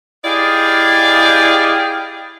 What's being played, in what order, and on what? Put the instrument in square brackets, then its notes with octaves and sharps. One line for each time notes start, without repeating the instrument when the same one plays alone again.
[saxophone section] E4 G4 G#4 D5 D#5 F5